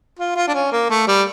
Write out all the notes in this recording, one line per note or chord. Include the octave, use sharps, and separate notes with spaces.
F4
F4
D4
C#4
A#3
A3
G3